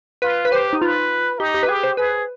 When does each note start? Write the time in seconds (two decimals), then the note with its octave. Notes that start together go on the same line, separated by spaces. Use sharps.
0.22 F4 B4
0.45 B4
0.52 G4 C5
0.73 D#4
0.81 F4 B4
1.39 D#4 G4
1.54 G4
1.63 B4
1.69 G4 G#4
1.84 C5
1.97 G#4 B4